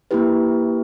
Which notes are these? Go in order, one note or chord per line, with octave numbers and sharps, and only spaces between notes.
A#3 E4 G4 B4